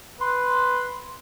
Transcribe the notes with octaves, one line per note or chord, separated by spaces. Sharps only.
B4 C6